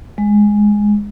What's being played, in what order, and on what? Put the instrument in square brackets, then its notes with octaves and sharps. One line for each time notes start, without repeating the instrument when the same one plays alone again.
[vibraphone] G#3